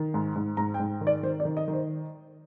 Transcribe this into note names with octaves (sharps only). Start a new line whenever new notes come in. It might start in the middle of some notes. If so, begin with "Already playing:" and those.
Already playing: D#3
G#2
G#2
G#2 A#5
G5
G#2
D#3
D5
D#3 C5
D5
D#3
D#5
D#3
C5